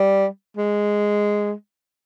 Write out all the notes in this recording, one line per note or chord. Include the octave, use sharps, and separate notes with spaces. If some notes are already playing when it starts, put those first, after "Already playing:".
Already playing: G3
G#3